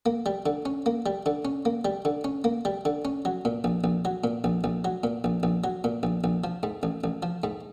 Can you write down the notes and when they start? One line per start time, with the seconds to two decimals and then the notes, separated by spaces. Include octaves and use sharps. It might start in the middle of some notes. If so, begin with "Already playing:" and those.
0.06 A#3
0.26 G3
0.46 D3
0.66 C#4
0.86 A#3
1.06 G3
1.26 D3
1.45 C#4
1.65 A#3
1.85 G3
2.05 D3
2.24 C#4
2.44 A#3
2.65 G3
2.85 D3
3.05 C#4
3.25 F#3
3.45 A#2
3.64 A#1
3.84 A#1
4.05 F#3
4.24 A#2
4.44 A#1
4.64 A#1
4.85 F#3
5.04 A#2
5.24 A#1
5.43 A#1
5.64 F#3
5.84 A#2
6.03 A#1
6.24 A#1
6.44 F3
6.63 G#2
6.83 A1
7.04 A1
7.23 F3
7.44 G#2